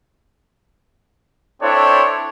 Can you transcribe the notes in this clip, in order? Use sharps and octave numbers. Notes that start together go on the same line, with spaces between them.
C4 D4 E4 A4 C5 C#5